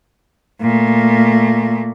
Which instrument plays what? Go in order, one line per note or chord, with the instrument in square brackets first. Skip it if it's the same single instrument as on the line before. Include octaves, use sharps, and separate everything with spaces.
[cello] A#2 A3